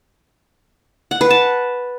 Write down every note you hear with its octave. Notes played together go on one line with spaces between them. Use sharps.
F#5
B4
A5